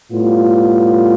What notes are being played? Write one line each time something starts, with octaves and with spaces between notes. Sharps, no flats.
A2 G3 B3 F4